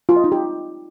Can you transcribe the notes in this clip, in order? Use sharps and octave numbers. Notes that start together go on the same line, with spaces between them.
F4
D#5
D#4
G4